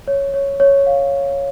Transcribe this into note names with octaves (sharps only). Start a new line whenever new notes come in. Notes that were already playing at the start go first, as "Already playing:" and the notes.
C#5
C#5
C#5
F5